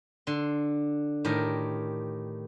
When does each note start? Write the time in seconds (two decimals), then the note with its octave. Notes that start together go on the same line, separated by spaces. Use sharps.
0.27 D3 C6
1.25 A2 D#3 G4 A#4